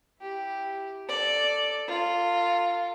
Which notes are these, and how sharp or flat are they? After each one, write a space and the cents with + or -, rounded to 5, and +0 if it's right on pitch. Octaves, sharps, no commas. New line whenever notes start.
E4 +0 G4 +0
A4 +0 D5 +0
F4 +0 A4 +45